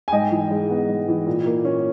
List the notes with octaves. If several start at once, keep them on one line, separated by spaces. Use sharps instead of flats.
G#5
G#2 D#5 G5
E3
G#3
B3
G#2
E3
A#2
A#3
C#4